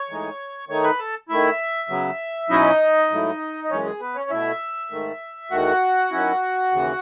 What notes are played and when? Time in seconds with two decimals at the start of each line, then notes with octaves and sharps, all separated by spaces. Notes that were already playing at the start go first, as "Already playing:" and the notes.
Already playing: C#5 C#6
0.09 A2 E3 G#3 D#4
0.69 D#3 A3 D#4 C#5 C#6
0.84 B4 B5
0.99 A4 A5
1.29 D#3 A3 E4 E5
1.89 C#3 F#3 B3
2.49 B2 F#3 C#4 D#4 E4 D#5
3.10 G#2 F#3 A3 E4
3.64 D#5
3.70 F#2 E3 G#3 C#4 C#5
3.85 G#4
4.00 B3 B4
4.15 C#4 C#5
4.30 B2 A3 E4 E5
4.91 G#2 D#3 A3
5.51 E2 D#3 A3 F#4 F#5
6.11 D#3 F#3 C#4 E4
6.71 D#2 C#3 E3